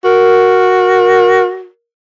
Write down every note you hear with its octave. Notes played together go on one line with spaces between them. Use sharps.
F#4 A#4